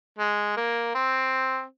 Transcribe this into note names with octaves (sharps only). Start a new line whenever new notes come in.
G#3
A#3
C4